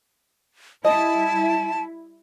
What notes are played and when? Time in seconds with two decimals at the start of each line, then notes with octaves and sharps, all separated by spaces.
0.85 G3 E4 D#5 A5